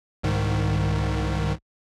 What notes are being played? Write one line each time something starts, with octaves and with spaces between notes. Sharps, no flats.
C2 G#2 D#3